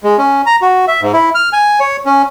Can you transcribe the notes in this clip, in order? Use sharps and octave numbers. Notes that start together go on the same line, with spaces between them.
G#3
C#4
A#5
F#4
E5
G#2
E4
F6
G#5
C#5
C#4